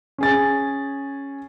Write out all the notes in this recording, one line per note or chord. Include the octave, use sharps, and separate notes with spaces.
C#4 G#4 A6